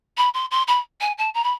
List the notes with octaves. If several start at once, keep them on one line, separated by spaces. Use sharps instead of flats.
B5
C6
C6
B5
G#5
A5
A#5
B5